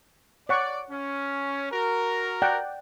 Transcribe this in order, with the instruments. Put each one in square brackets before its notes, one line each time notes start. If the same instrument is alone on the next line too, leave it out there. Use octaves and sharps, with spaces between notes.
[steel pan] C#5 F#5 C#6 [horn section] D5
[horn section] C#4
F#4 A#4
[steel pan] D5 F#5 G5